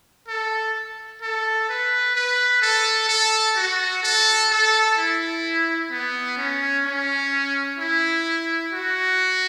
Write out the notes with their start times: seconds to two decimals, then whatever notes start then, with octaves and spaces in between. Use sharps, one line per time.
0.28 A4
1.22 A4
1.69 B4
2.16 B4
2.62 A4
3.09 A4
3.57 F#4
4.03 A4
4.50 A4
4.97 E4
5.91 B3
6.37 C#4
6.85 C#4
7.79 E4
8.73 F#4